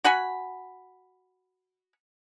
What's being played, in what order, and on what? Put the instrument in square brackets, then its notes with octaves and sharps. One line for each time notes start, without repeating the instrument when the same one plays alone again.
[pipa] F#4 F#5 G#5 B5